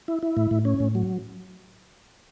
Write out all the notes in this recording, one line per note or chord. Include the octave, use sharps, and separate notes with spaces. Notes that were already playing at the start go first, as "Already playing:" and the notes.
E4
E4
A2
A2
C#4
A2
F#3